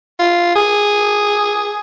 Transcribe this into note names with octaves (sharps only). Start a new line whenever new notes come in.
F4
G#4